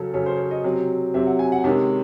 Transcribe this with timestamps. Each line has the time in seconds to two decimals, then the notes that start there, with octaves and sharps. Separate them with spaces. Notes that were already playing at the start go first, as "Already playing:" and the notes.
Already playing: C#3 F#3 C#4 A4
0.14 C#3 F#3 C#4 A4
0.26 C5
0.38 C#5
0.51 D#5
0.63 C3 F#3 C4
1.14 C3 F#3 C4 E5
1.27 F#5
1.39 G#5
1.52 F#5
1.64 C3 D#3 G#3 C#4 A5